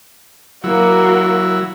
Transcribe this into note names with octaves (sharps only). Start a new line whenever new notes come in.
F#3 A#3 E4 F#4